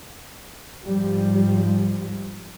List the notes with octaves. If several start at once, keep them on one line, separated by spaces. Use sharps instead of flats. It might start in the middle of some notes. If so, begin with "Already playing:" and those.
G#2 F3 G3